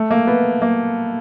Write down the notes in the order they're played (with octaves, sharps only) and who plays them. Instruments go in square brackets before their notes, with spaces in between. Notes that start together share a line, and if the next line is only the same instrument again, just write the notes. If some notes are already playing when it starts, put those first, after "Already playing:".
Already playing: [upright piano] A3
A#3
B3
A#3